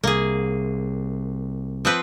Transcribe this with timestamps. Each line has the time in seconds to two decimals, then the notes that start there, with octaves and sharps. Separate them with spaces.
0.04 C2 A#3 G#4
1.85 F3 C4 B4